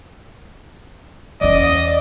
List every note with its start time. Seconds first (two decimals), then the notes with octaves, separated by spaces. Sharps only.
1.41 E2 C#4 D5 D#5